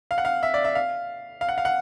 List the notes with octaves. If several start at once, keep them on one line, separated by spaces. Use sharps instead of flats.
F5
F#5
F5
E5
D5
E5
F5
F5
F#5
F5
F#5